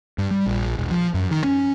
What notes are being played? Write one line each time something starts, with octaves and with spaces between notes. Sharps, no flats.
G2
G3
A#1
E1
F3
F#2
D#3
C#4